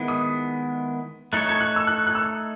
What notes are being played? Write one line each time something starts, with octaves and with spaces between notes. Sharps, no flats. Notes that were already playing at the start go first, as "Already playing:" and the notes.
Already playing: D#3 G#3 B3 E4
D#6
A3 D#4 A4 C#5 F#6
G#6
F#6
E6
F#6
F#6
E6